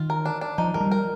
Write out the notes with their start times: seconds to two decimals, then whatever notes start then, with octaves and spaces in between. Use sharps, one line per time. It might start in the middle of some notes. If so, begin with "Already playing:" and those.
Already playing: D#3 F4
0.10 A#4
0.26 D4
0.41 D4
0.58 F3 D#4
0.74 F3 A#4
0.80 G3
0.91 A#4